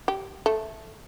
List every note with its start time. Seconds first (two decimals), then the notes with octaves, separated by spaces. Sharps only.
0.08 G4
0.46 A3